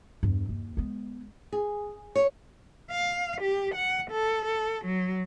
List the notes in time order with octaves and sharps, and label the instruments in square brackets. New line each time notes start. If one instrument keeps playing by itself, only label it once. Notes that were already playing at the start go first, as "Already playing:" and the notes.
[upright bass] E2 G2
D#2
G#3 B3
[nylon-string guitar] G#4
C#5
[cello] F5
G4
F#5
A4
A4
F#3